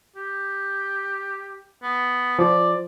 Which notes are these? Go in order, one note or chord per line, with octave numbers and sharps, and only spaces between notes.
G4
B3
F3 D5